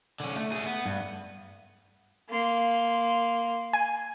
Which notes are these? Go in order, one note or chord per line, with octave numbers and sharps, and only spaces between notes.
D3 C#4
A3
A3 G#4
B3
G2
A#3 C6
G#5